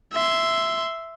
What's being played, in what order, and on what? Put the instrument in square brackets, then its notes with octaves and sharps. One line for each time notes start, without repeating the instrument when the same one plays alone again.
[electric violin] E5 C6